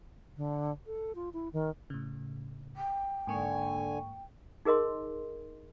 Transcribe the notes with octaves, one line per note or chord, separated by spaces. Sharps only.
D3
A4
F4
E4
D#3
A2 C#3
G5
G#2 D3 A#3 G#5 C#6
D#4 G#4 A#4 D#5 C6